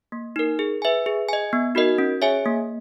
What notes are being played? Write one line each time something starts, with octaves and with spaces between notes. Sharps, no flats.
A#3
D#4 A#4
G#4
B4 E5 G#5
G#4
D#5 G#5
B3
D#4 F#4 A#4 D#5
C#4
G#4 C#5 E5 G#5
A#3